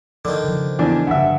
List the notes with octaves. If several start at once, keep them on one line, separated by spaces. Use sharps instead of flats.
D3 D#3 F3
C#3 F3
E2 D4
G2 D3 E5 F#5